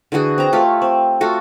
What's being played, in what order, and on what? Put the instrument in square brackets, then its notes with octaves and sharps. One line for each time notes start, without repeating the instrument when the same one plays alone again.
[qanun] D3 E3 F#4 G#4
C4 A#5
A3 F4 G4 C#5
C4
A3 F4 F#4 A4